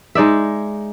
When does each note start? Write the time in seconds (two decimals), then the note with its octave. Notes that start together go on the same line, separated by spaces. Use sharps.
0.15 G#3 D#4 D5 E5